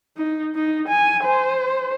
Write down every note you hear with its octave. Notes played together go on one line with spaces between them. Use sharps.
D#4
D#4
G#5
C5